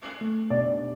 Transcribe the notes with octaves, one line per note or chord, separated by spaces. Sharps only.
A3
B2 D5